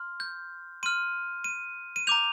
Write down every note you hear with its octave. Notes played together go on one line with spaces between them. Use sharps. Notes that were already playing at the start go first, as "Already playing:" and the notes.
Already playing: C6 F6
G6
C6 F6 D#7
D#7
D#7
A#5 D6 G6 F7